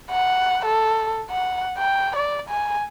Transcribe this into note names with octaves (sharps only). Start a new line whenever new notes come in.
F#5
A4
F#5
G5
D5
G#5